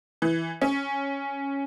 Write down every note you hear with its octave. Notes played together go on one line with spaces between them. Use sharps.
E3
C#4